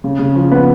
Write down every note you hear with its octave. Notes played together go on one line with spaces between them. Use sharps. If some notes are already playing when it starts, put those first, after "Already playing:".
C#3
C#3
F3
B3